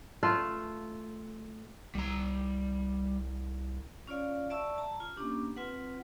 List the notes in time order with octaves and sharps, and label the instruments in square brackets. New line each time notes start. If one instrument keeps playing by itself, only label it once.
[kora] A3 F4 B4
[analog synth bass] C2 [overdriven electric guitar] G3 A#5
[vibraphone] C#4 F4 C#5 D5 F5
D5 E5 A5 C#6 E6
A5 A#5
F4
A#3 B3 C#4 D4 G4
C4 F4 B4 F#5